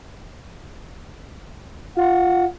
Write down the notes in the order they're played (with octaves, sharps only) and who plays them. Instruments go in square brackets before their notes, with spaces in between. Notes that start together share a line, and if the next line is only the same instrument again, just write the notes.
[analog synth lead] F4 [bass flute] F#5